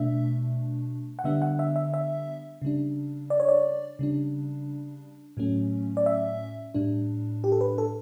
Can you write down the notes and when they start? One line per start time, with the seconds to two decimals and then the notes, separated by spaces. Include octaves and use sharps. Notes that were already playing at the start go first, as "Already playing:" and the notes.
Already playing: B2 A3 D4 E5
1.19 F#5
1.24 D3 G3 B3 D4 E5
1.42 F#5
1.59 E5
1.76 E5
1.94 E5
2.62 C#3 G3 D4
3.30 D5
3.40 C#5
3.48 D5
3.99 C#3 G3 D4
5.37 A2 F#3 A3 C#4
5.97 D5
6.06 E5
6.74 A2 G3 D4
7.44 G4
7.52 A4
7.61 B4
7.78 A4